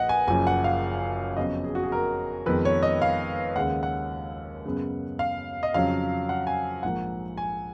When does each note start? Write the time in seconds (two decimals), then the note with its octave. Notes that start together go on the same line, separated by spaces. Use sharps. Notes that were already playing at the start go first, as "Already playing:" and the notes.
Already playing: A#1 A#2 B4 D#5 F#5
0.09 G#5
0.27 F#1 F#2 F3 G#5
0.47 F#5
0.64 F5
1.37 F2 C#3 F#3 B3 D#5
1.64 G#4
1.75 F#4
1.83 G#4
1.92 A#4
2.46 F2 D#3 G#3 B3 B4
2.65 C#5
2.83 D#5
3.02 F5
3.56 D#2 C#3 G#3 F#5
3.83 F#5
4.65 F#2 C#3 G#3 B3
5.19 F5
5.63 D#5
5.74 F2 C#3 F#3 F5
6.29 F#5
6.47 G#5
6.83 A#1 G#2 F3 A#3 F#5
7.37 G#5